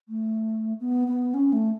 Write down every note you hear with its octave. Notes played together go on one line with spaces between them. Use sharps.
A3
B3
B3
C#4
A3